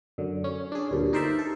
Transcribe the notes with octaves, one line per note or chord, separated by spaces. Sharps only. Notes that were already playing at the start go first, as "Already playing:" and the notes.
F#2 D3
C#4
D4 G#4
D2 G2 A#2
D#4 A#4 C5 D5 E5
A4